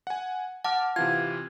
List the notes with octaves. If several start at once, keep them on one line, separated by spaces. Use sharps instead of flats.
F#5 G#5
F#5 A5 D6 F6
C3 E3 F4 G#6